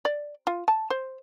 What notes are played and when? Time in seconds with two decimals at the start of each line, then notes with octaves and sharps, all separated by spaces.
0.05 D5
0.47 F4
0.68 A5
0.90 C5